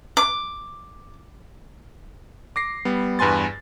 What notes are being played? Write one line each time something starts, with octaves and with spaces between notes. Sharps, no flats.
D6
D6 A#6 C7
G3 B3
E2 G2 B4 G#5 C6 A6